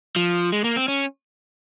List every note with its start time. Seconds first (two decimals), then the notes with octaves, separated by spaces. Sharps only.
0.16 F3
0.52 G#3
0.64 A#3
0.76 C4
0.88 C#4